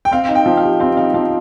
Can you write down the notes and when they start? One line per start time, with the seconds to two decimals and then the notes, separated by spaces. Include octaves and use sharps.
0.05 G5
0.12 C4 F5
0.29 D#4
0.35 G5
0.46 F3
0.57 F5
0.63 G4
0.80 C4 F5
0.97 D#4 F5
1.14 F3 F5